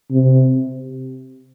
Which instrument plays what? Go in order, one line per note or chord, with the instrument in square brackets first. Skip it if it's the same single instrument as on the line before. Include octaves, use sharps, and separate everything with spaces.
[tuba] C3